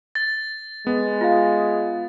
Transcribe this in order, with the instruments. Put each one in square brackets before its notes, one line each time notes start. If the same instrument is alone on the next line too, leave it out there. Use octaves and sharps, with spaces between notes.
[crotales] A6
[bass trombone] G#3 [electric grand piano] B3
[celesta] F4 F5